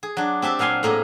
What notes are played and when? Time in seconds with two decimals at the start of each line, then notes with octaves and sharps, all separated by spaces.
0.03 G#4
0.17 F#3 D4
0.42 C4 G4 E5 A5
0.59 A#2 F#3 F5 G#5 C6
0.83 A2 A#3 G#4 D#5